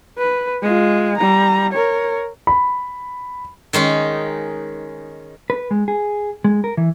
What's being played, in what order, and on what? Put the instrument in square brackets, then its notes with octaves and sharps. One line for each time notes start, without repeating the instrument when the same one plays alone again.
[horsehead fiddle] B4
G#3 F4
G3 A#5
A#4 C#5
[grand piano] B5
[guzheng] D#3 G#3 C#4 D#4
[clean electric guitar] B4
G#3
G#4
G#3
A#4
E3